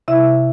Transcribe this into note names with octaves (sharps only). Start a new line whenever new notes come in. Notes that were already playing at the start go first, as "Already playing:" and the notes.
C3 E4 E5